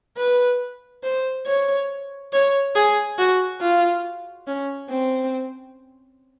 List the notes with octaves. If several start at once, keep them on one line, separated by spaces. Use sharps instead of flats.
B4
C5
C#5
C#5
G#4
F#4
F4
C#4
C4